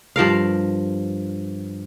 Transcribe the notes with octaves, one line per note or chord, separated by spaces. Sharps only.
G2 F3 A#4 F5